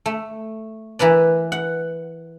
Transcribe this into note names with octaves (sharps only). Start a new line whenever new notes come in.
A3
E3 A#4 B4 D5
F#5